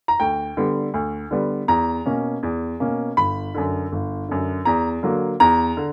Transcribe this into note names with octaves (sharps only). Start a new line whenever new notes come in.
A#5
D2 G5
D3 G3 B3
D2
D3 G3 B3
E2 A#5
B2 A#3 C#4
E2
B2 A#3 C#4
G1 B5
F#2 D3
G1
F#2 D3
E2 A#5
D3 F#3 A#3
E2 A#5
D3